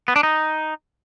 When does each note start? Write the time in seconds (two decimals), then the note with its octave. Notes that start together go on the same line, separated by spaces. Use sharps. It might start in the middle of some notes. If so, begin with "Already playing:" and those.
0.08 B3
0.16 D4
0.23 D#4